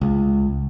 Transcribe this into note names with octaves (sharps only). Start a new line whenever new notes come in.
C#2